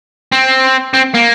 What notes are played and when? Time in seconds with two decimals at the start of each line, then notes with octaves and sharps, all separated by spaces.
0.32 C4
0.94 C4
1.14 A#3